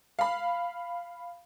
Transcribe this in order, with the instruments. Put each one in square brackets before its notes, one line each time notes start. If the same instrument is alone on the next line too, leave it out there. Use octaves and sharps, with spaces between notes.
[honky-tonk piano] F5 B5